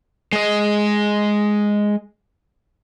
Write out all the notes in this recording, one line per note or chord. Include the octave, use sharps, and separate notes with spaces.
G#3 D#5